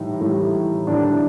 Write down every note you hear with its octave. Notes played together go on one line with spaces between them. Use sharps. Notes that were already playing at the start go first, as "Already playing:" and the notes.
Already playing: A2 E3 G3 D#4
A2 E3 G3
A2 E3 G3 D4